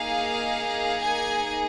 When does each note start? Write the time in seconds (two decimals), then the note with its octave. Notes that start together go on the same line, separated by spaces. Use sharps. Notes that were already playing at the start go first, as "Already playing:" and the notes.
Already playing: A#3 D#4 G#4 F5
1.02 G#5